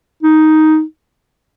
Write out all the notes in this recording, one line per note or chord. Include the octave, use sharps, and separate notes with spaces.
D#4